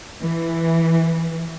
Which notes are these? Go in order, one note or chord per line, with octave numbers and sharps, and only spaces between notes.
E3